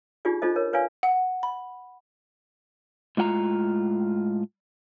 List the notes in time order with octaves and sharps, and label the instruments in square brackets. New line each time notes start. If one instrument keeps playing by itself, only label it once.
[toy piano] D4 D#4 F4 G4 G#4 D5
D4 D#4 F4 A4 C5 D#5
A#4 C#5
B4 C#5 D5 F5 G#5
[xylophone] F#5
B5
[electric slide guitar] A2 G#3 F4 F#5 A#5